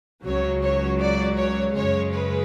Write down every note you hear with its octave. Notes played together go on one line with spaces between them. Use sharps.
C#2 C#3 F#3 C#5
C#5
D5
C#5
F#2 C#3 G#3 C#5
B4